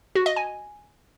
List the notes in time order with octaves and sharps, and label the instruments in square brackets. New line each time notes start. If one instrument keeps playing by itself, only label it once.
[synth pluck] F#4
D#5
G#5